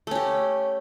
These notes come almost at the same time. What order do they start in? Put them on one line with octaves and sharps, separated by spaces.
A3 C#4 G4